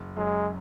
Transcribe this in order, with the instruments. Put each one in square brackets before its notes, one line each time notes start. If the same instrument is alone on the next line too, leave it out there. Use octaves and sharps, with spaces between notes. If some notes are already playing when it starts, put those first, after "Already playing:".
Already playing: [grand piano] F#1
[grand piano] F#2 F#3 C#4 [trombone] G#3